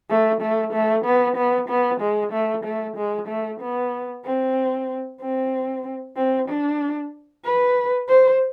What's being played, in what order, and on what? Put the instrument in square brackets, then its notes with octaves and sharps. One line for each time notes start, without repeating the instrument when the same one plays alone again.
[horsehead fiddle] A3
A3
A3
B3
B3
B3
G#3
A3
A3
G#3
A3
B3
C4
C4
C4
D4
B4
C5